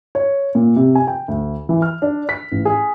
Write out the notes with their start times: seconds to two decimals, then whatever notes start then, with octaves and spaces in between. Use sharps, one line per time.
0.15 C#5
0.55 A#2
0.76 C3
0.95 G#5
1.07 G5
1.28 D2
1.69 E3
1.82 F6
2.02 D4
2.29 B6
2.52 A1
2.65 G#4